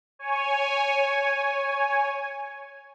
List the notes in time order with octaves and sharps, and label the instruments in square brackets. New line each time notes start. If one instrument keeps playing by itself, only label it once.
[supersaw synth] C#5 G#5